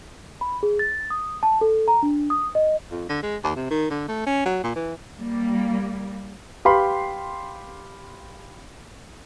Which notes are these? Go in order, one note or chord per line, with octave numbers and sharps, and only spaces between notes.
B5
G#4
A6
D#6
A5
A4
A#5
D4
D#6
D#5
F2
D3
G#3
D#2
C3
D#3
D3
A3
C#4
F#3
A#2
E3
G3 A#3
G4 B4 F5 B5 C6